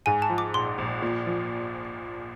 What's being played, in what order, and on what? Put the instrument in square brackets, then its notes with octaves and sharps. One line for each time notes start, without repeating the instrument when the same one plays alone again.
[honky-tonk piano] G#2 [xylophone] G#5
[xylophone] A5
[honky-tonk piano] F3
[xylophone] D6
[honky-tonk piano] A#1 [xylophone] C6
[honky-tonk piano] A#1
A#2
F3